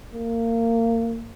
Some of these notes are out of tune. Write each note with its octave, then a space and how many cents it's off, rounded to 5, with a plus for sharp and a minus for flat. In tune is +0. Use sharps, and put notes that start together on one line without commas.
A#3 -25